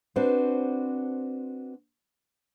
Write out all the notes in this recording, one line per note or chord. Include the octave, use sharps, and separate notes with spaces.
C4 D4 F#4 B4 C5